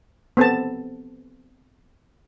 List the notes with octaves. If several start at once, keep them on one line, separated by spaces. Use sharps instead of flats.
B3 C4 A4 A5